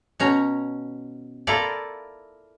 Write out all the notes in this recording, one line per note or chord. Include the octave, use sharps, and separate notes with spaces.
B2 C#4 A#5
E4 F4 A4 A#4 D5